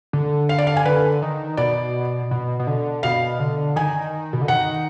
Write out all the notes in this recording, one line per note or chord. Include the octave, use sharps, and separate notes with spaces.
D3
F5
D5
F5
G#5
D3 B4
D#3
B2 D5
B2
B2
D3
B2 F5
D3
D#3 G#5
B2
D3
D#3 F#5